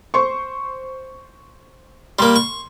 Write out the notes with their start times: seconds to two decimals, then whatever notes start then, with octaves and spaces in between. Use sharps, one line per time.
0.14 C5 C6 C#6
2.19 G3 A#3 C6
2.36 C#6